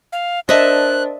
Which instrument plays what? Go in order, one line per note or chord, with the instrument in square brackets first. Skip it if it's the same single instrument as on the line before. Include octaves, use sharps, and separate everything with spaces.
[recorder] F5
[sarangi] D4 [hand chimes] A#4 C5 [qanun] D#5 E5 A5 [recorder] F#6